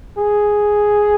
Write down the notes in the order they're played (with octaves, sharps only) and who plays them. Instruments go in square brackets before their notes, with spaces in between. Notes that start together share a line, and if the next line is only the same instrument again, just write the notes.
[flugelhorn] G#4